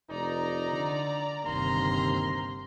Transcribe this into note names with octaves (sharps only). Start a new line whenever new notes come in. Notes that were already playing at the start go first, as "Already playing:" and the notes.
F1 D#4 D5 A#5
D3
G1 D#2 C3 A#3 A#5 C6